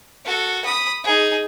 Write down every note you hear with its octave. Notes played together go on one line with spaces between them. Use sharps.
F#4 A4
B5 D#6
D#4 G#4